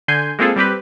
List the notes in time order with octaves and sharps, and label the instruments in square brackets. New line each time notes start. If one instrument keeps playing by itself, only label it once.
[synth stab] D3 G#5 C6 G6
G#3 A#3 C4 F4 G#4 A4
G3 C4 G4 B4